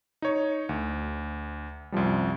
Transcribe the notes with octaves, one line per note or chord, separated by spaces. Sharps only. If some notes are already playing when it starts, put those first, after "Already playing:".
D#4 C#5
D2
C2 F#2 F3 G3